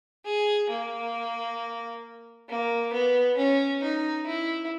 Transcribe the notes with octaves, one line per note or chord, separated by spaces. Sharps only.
G#4
A#3
A#3
B3
C#4
D#4
E4